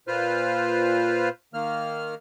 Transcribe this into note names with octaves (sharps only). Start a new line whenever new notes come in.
A#2 F4 B4 C5 F6
D#3 A#3 F6